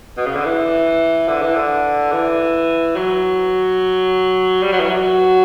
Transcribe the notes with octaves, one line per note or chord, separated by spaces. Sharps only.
B2
C#3
D3
E3
D3
E3
D3
E3
F#3
G3
F#3
E3
F#3